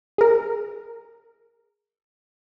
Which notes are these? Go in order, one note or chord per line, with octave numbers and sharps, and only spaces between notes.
G#4 A#4